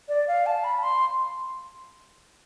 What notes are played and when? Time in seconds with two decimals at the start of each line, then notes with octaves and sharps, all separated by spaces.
0.09 D5
0.28 F5
0.46 A5
0.64 B5
0.83 C6